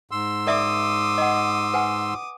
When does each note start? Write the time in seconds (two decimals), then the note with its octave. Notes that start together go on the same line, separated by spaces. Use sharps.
0.11 G#2 C6 E6
0.47 A#4 D5 E5 D6 D#6
1.18 D#5 F#5
1.74 B4 F#5 G#5